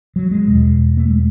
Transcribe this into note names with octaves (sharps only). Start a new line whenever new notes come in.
F#3
G#3
E2 B2
A3
G#3